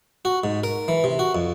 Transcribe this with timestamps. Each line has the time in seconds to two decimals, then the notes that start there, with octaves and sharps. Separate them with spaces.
0.25 F#4
0.44 G#2
0.64 A#4
0.88 E3
1.04 C3
1.19 F#4
1.35 F2